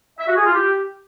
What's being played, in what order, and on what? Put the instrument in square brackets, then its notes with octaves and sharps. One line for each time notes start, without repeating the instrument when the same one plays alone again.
[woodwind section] E5
F#4
G#4
F4
G4